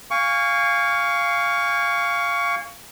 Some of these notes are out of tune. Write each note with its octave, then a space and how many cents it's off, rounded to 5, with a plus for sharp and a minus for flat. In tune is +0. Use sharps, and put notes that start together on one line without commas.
F5 +0 G#5 -25 C#6 +20